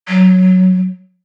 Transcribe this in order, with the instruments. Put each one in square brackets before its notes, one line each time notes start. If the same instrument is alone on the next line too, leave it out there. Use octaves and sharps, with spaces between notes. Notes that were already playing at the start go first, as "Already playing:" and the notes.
[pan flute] F#3